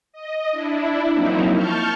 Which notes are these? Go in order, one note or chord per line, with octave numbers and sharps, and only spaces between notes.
D#5
D4 E4
F3 F#3 A#3 C4 D#4 E4
A5 C#6 F6 G6